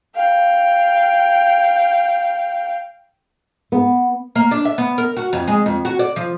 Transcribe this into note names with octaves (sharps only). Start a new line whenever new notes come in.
F5 G5
B3
A#3
D4
E5
B3
A#4
F#4
F2
G#3
F2
F#4
D5
F3